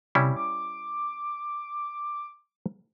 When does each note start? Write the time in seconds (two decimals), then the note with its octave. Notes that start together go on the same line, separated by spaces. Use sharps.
0.15 C3 G3 C#4 E4
0.36 D6